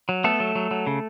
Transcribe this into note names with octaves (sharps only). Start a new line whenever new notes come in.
F#3
A3 B3 A4
F#3
F#3
F#3
C#3